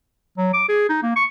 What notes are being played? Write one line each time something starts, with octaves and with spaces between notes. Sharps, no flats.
F#3
D6
G#4
D#4
A#3
C#6